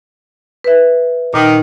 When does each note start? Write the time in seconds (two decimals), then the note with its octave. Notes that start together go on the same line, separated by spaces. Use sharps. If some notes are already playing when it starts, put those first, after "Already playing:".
0.64 B4 E5
1.34 A#2 D#3 D#4